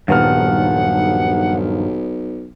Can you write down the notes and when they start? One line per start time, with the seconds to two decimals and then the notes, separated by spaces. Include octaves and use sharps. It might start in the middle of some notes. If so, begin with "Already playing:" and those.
0.08 D#1 B1 G2 D#3 F3 B3 F#5 F6